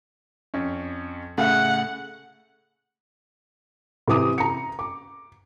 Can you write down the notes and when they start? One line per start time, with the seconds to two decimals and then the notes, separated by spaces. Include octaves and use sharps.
0.54 F2 C#4
1.38 A2 C#3 A3 F#5
4.08 C3 E3 D6 D#6
4.38 A#5 C#7
4.79 D6